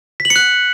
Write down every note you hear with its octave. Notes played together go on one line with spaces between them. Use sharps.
B6
F#7
C#7
F#6